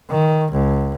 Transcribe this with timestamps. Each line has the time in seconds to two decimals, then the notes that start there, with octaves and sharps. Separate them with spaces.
0.10 D#3
0.52 C#2